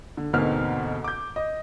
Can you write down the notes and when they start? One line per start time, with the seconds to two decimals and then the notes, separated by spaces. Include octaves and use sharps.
0.17 D3
0.33 D2 G#2 B2 A#3 C4 F6
1.04 D6 G6
1.36 D#5